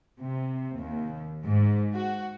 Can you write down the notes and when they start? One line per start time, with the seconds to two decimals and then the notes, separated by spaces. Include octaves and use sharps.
0.19 C3
0.77 D#2
1.44 G#2
1.94 F#4